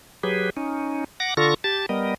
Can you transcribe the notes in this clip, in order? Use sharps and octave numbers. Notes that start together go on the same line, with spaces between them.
F#3 G4 G#4 B4
C#4 D#4
F#5 D6 A#6
D3 F4 A4 C#6 A#6
G4 A5 A6
G3 B3 A#4 D#5